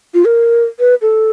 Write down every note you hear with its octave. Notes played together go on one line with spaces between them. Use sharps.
F4
A#4
B4
A4